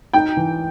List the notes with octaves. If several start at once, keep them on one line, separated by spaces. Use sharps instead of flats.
D#4 G5
E3